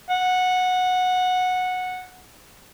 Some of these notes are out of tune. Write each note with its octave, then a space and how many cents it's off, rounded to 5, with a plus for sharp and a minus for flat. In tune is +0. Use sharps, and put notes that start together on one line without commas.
F#5 -15